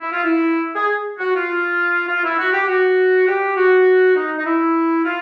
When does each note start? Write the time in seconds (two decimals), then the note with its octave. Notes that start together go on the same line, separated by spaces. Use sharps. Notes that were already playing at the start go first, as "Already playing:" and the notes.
0.01 E4
0.12 F4
0.24 E4
0.75 G#4
1.19 F#4
1.35 F4
2.08 F4
2.24 E4
2.38 F#4
2.53 G4
2.68 F#4
3.28 G4
3.57 F#4
4.15 D#4
4.38 D#4
4.46 E4
5.04 F4